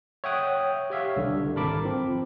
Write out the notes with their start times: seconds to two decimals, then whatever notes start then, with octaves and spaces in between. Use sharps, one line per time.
0.24 C#5 E5 F#5 G5 D#6 F#6
0.90 G4 C#5 E5 F5
1.16 C2 D3 G3
1.56 G#1 A#4 A5 B5 D6
1.85 F3 C4